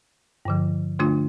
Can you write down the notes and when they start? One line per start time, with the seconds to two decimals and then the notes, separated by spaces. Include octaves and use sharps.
0.45 G2 D3 F3
0.99 D3 A3 D4 F4